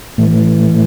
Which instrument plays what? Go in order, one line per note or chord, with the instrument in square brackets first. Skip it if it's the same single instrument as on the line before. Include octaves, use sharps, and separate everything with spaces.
[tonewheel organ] A2 E3 A3